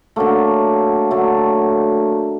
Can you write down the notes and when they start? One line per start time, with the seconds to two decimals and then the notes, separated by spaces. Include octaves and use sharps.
0.16 D3 F#3 A3 A#3
1.11 D3 F#3 A3